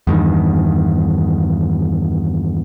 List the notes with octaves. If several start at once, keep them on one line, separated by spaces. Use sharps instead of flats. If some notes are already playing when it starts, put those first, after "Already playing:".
E2 G2 D#3